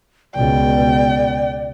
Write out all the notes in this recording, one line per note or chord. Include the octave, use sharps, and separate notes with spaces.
C#2 B2 D5 G5